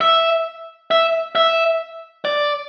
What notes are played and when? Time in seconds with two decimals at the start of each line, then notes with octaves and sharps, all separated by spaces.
0.01 E5
0.91 E5
1.35 E5
2.25 D5